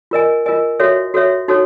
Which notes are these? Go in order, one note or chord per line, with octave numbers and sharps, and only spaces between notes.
F4 A#4 D#5 G#5
F4 A#4 D#5 G#5
F#4 A4 C#5 E5
F#4 A4 C#5 E5
D#4 F#4 A4 C#5